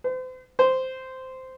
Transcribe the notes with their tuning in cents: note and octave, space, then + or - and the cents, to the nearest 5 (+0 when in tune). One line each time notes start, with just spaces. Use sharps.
C5 -40
C5 -10